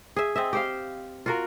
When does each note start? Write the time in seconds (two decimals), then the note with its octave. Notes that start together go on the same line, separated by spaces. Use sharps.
0.16 G#4 E5
0.36 C4 D#5 E5
0.53 G4 C5 F5
1.26 F4 F#4 A#4